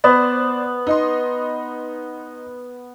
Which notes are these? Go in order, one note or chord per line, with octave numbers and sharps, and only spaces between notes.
B3 C5 D5
D#4 D#5 C6